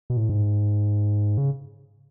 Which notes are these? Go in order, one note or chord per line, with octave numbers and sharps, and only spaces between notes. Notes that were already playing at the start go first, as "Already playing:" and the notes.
B2
A2
G#2
C#3